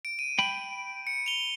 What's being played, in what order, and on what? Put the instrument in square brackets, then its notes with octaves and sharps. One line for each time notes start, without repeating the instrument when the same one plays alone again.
[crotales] D7
D#7
[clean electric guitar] G5 B5
[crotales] C#7
F7 G7